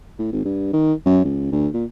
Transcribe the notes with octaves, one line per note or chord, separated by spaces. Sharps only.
A2
G#1
G2
D#3
F#2
C#2
D2
A#2